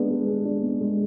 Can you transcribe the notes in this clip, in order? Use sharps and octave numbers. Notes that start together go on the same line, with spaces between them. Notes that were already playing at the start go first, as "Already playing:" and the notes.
Already playing: G#3 B3 D4
G#3
G#4
D4
B3
G#3